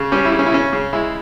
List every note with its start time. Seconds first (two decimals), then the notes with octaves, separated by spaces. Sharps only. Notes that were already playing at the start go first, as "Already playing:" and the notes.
Already playing: C#3
0.12 G3 C#4
0.25 E4
0.32 C#3
0.39 C#4
0.46 E4
0.52 C#3 C#4
0.73 C#3
0.93 G#3 E4